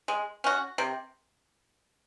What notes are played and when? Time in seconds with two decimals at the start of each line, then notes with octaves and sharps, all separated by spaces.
0.08 G#3
0.44 C#4 F#4
0.78 C3